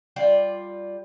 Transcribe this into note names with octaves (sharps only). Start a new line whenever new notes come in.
G3 F4 D5